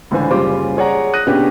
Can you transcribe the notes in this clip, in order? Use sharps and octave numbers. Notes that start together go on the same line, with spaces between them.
C#2 A2 D3 E3 C5 G#5
F#1 C#3 G3 F4 C5 D6
G#4 C#5 D5 F#5 A#5
D#6 F#6 A#6 D#7
A#2 C#3 B3 C#4 D4 G4